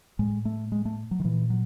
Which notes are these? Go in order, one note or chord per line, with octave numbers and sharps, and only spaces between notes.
A2 G#3
A3
G#3
A3
F#3
D#3
A#2 E3
F#3